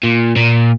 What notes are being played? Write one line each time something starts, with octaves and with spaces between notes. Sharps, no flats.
A#2
A#2